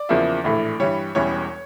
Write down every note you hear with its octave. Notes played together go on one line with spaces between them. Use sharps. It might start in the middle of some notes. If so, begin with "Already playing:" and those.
Already playing: D5
E2 C#3 F3 A#3 E4
A#1 A2 E3 A3
G2 E3 G3 C#5
E1 E2 E3 G3 C#4 C#5